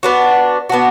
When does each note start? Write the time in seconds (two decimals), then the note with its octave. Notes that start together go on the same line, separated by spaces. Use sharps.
0.03 B3 D4 F#4
0.69 B3 D4 F#4